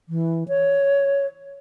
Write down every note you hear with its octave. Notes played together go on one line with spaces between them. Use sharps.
E3
C#5